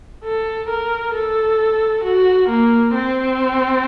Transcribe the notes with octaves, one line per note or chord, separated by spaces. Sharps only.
A4
A#4
A4
F#4
A#3
C4